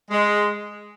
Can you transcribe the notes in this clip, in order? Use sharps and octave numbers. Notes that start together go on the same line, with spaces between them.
G#3